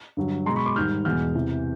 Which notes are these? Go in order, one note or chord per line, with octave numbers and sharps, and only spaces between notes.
G2 D3 F#3
B2 G#3 A#5 C6
B5 C#6
C6 D6
G#2 D#3 G3 F6 G6
E2 B2 G#3 F6 G6
E2 C3 E3